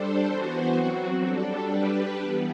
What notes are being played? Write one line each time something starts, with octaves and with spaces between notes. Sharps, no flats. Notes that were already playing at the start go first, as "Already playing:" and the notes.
Already playing: G3 D4 A4 C5
E3 B3 F#4 C5
F#3 C4 F#4
G3 D4 A4
G3 D4 G4 B4
E3 G3 B3